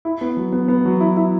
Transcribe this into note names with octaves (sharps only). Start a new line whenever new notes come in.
E4
B3
F#3
B3
B3
F#3
E4
E4